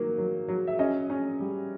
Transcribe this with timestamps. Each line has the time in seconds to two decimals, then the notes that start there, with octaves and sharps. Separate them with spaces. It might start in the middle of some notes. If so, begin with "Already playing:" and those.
Already playing: D#3 F#3 A#3
0.18 F#3
0.48 F#3
0.67 E5
0.79 C#4 D#5
1.10 C#4
1.40 G3